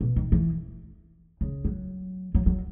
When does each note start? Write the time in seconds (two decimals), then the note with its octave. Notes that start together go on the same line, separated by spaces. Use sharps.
0.01 B2
0.16 D#3
0.32 E3
1.41 C#3
1.65 F#3
2.35 F#3
2.46 F#3